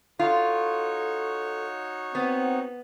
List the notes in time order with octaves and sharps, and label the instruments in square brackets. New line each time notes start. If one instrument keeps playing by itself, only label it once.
[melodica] D#4 F#4 C#5 [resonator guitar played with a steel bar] F4 [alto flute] A4
[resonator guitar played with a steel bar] B3 [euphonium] C4 [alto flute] F#5